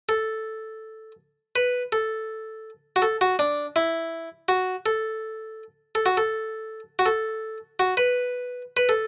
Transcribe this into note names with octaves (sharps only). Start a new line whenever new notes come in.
A4
B4
A4
F#4
A4
F#4
D4
E4
F#4
A4
A4
F#4
A4
F#4
A4
F#4
B4
B4
A4